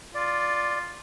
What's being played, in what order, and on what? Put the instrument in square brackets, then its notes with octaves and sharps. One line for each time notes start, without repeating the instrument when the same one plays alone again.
[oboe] F4 [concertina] D5